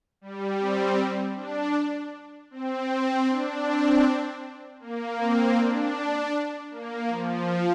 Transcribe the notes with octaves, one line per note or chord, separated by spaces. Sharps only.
G3
C4
D4
C4
D4
C4
A#3
C4
D4
A#3
F3